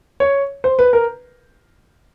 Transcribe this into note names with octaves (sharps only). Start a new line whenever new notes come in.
C#5
C5
B4
A#4